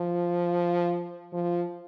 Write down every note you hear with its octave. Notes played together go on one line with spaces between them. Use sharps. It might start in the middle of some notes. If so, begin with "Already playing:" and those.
Already playing: F3
F3